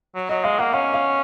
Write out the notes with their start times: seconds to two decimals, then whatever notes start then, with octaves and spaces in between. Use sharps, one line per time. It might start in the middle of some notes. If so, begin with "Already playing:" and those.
0.15 F#3
0.29 F#3 D#5
0.44 G#3 F5
0.59 A#3 F#5
0.73 C#4 F5
0.94 F5